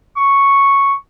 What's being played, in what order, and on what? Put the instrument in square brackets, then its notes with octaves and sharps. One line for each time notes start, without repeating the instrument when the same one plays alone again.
[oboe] C#6